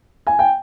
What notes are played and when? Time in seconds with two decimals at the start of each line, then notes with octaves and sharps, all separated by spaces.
0.27 G#5
0.39 G5